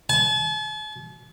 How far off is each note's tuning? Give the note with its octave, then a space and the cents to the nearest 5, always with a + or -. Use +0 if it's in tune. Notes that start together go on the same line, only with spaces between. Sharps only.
A5 -45